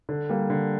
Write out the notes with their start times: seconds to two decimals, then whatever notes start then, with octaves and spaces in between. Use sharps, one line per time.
0.09 D3
0.29 G3 A#3
0.50 D3